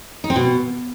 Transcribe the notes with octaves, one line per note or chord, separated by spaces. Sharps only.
D#4
C4
B2